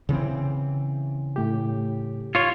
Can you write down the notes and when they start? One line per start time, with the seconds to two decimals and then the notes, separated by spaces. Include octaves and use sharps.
0.09 C#3 E3 C4
1.36 A2 G4
2.35 F4 C#5